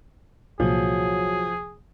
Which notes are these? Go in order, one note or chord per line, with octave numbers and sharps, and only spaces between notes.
C2 A#2 F3 F#3 G#4